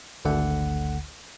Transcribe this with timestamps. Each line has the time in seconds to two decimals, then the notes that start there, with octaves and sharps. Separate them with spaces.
0.25 G#1 D2 D3 F#5